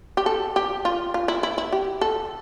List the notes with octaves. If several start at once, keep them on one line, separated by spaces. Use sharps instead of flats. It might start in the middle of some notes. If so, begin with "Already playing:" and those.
G4
A4
G4
F4
F4
E4
E4
E4
G4
A4